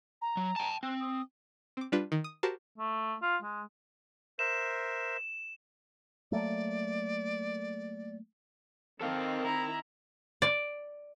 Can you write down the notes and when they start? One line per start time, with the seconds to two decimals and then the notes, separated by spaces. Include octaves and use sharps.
0.22 A#5
0.37 F#3
0.56 G5 A5
0.83 C4 F#6
1.00 D#6
1.77 C4 D6
1.92 G3 D4 F4 B4
2.12 D#3
2.24 D#6
2.43 F#4 G4 A#4 C5 A5 A#5
2.78 A3
3.22 F4
3.42 G#3
4.39 A#4 C5 E5 E7
6.32 F#3 A3 A#3 D5
9.01 D#3 C4 A4 F5
9.45 E4 A#5
10.42 D5